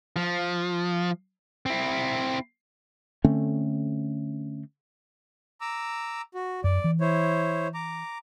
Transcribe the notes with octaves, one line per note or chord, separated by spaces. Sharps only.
F3
C4 E4
D3 A3 C4 C#4
A#5 D6 E6
F#4
F#2 D5
E3
E4 C5 C#5
A#5 D6